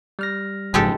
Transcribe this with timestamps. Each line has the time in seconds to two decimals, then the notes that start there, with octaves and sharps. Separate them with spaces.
0.19 G3 F6 A#6
0.74 F#1 G#2 F3 G#3 G4 A4